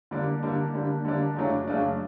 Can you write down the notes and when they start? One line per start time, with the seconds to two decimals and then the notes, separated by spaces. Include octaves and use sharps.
0.11 D3 G3 A#3 D4
0.43 D3 G3 A#3 D4
0.73 D3 G3 A#3 D4
1.05 D3 G3 A#3 D4
1.36 F#2 C#3 F#3 A3 D4
1.67 F#2 C#3 F#3 A3 D4